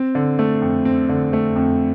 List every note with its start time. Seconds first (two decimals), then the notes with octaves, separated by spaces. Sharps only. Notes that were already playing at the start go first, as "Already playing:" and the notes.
Already playing: C4
0.15 D3
0.39 A3
0.62 F2
0.85 C4
1.09 D3
1.33 A3
1.56 F2